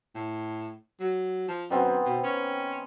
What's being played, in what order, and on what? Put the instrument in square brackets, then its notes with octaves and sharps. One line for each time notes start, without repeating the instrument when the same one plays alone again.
[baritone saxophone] A2
F#3
F3
[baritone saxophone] F#2 [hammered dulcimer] D#3 B3 C4
[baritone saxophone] B2
C#4